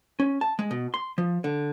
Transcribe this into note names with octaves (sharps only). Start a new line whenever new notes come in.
C#4
A5
G#3
B2
C6
F3
D3